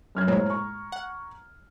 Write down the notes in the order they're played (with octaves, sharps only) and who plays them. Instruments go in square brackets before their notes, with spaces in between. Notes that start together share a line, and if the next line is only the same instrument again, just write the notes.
[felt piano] F#2 F6 G#6
[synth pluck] A2 G#3 A#3 [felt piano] C5 C#5 A#5
[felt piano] A#5 C#6
[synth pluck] F#5